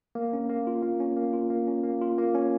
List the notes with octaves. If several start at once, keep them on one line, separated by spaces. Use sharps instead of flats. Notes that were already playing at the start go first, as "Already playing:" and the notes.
A#3
C#4
A#3
F4
A#3
C#4
A#3
F4
A#3
C#4
A#3
F4
A#3
C#4